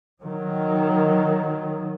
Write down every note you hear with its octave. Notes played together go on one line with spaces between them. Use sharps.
D#3 F#3